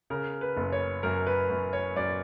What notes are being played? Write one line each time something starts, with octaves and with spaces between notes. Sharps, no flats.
C#3 A#4
B4
F#1
C#5
F#2 A#4
B4
F#2
C#5
F#2 D5